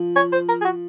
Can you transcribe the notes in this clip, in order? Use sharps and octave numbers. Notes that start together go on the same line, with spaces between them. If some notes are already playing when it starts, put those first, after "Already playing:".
Already playing: F3
C#5
C5
A#4
G#4
F#4